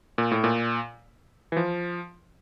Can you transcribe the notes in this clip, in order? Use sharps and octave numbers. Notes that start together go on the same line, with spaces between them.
A#2
A2
A#2
E3
F3